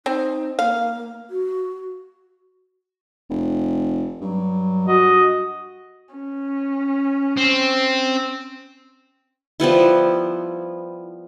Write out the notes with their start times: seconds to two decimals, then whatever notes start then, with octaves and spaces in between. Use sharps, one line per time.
0.06 C4 D#4
0.59 A#3 F5
1.30 F#4
3.30 F1
4.21 G2 F#3
4.88 F#4 D#5
6.16 C#4
7.37 C4
9.60 F3 G3 B3 E4